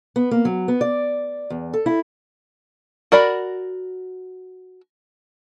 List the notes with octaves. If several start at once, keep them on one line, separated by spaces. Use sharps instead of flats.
B3
A#3
F#3
B3
D5
E2
A4
E4
F#4 A#4 D5 B5